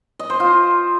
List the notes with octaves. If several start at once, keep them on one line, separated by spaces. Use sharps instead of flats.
D#5
C5
F4